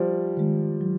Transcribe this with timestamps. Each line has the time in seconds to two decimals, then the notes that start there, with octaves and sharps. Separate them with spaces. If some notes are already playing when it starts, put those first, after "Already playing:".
Already playing: F3 G3
0.37 D#3 G#3
0.81 F#3